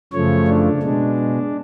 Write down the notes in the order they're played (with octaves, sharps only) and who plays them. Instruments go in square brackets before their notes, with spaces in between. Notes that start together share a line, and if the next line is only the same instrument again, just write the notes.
[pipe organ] F#2 C#3 F3 A3 C#5
D4
B2 G#3 D4